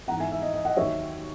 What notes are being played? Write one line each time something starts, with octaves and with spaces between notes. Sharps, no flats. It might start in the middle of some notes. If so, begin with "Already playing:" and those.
G#2 E3 F#5 A#5
E5 G#5
E5
D#5
D#5
D#5 F#5
D#2 D#3 F#3 C#5 E5